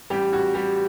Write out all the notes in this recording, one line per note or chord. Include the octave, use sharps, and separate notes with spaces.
A1 G3 G4
A1 F#4
G3 G4